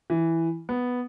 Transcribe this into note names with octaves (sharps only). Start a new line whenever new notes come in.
E3
B3